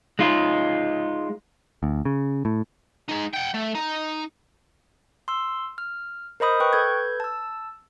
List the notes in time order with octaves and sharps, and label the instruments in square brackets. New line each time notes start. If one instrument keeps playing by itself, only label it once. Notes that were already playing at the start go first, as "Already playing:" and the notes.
[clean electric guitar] G#3 D#4 F4
[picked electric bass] D2
C#3
A2
[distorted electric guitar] G#3 D#4
F#5 G5
A3
D#4
[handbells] C6 E6
F6
A#4 C5 D#5 B5 D#6 G6
B4 G5 C#6 F#6
A4 B4 G6 G#6
A5 E6